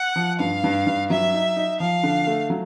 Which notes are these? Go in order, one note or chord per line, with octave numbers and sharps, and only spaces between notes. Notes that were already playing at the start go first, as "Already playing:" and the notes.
Already playing: F#5
F3
G2 F5
G2
G2
F#3 E5
D#4
D#4
F3 F5
D3
A3
F#3